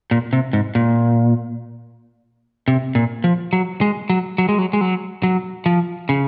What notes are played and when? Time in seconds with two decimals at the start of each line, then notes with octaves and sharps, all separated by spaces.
0.11 A#2
0.33 C3
0.53 G#2
0.75 A#2
2.68 C3
2.95 A#2
3.24 F3
3.53 F#3
3.81 G#3
4.10 F#3
4.38 F#3
4.49 G#3
4.58 F#3
4.73 G#3
4.81 F#3
5.23 F#3
5.66 F3
6.09 C#3